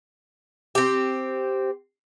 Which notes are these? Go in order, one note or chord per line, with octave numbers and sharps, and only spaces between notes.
C4 G4